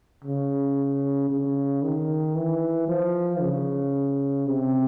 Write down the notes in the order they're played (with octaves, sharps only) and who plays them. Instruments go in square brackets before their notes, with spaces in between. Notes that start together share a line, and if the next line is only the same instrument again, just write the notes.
[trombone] C#3
C#3
D#3
E3
F3
C#3
C3